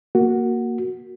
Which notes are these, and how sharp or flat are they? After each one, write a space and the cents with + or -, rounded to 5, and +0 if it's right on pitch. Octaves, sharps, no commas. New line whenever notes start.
A#3 +0 F#4 +0